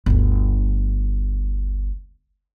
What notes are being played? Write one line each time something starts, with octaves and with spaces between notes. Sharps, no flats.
G1 D2